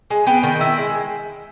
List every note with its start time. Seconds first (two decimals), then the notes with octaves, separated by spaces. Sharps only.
0.10 G#3
0.27 B3 G5
0.44 D#3
0.61 E4
0.77 G#3